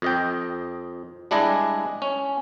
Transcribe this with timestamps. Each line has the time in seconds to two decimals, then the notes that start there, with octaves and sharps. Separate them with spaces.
0.02 F2 D#5 G5
1.31 G3 G#3 D4 E4 G#4 D#5
2.02 C#4